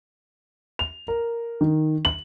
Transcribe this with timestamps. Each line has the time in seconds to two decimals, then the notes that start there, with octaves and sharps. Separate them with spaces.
0.79 F7
1.08 A#4
1.61 D#3
2.05 F#7